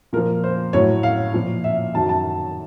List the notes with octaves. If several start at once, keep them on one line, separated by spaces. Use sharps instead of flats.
A#2 F3 A#4
C5
A2 F#3 C#5
F5
A#2 F3
E5
F#2 D#3 F#3 A5
A5